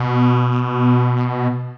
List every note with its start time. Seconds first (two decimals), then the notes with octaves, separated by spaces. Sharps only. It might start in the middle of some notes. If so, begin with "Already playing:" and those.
Already playing: B2